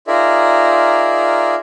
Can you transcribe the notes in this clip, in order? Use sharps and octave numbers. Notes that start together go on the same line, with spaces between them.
D#4 F4 G#4 A#4 D5 E5